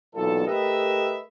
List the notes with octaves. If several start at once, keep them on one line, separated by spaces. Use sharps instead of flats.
B1 E2 A#2 A4
A3 G4 A#4 B4 D#5 E5